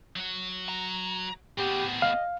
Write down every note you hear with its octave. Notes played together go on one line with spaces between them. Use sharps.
F#3 F#4
A#5
A2 B3 C4 G4 G#4
D#5 F5